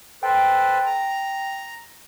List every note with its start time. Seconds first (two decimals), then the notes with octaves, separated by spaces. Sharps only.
0.23 A4 B4 C5 G5
0.86 A#5